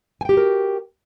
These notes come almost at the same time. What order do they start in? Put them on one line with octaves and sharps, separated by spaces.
G#5 G5 G4 F#4 A#4